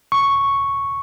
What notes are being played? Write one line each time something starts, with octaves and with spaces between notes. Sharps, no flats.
C#6